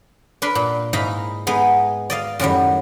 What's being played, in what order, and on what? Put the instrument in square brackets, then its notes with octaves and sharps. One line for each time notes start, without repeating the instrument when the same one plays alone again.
[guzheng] D4 A#4 B4 B5 C6
A#2
G#2 D#4 E4 F5 A#5 B5
G#3 B3 D#4 G#4
D5 D#5 F5
F#2 A2 D#3 F#3 G3